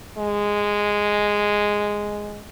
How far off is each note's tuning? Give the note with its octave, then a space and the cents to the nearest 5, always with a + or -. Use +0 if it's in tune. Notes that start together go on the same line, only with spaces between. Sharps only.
G#3 -5